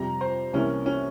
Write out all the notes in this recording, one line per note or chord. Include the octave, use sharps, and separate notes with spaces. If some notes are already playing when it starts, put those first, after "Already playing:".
Already playing: F2 C3 G3 A#5
C5
C2 C3 E3 A#3 C#4
C#4